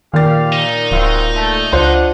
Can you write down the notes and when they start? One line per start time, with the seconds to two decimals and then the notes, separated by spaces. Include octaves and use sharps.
0.14 A#2 D#3 G4 F5 A6
0.52 D#4
0.91 D1 C4 F4 F#4
1.35 A3
1.73 C#2 D4 F4 C5 F#5 C6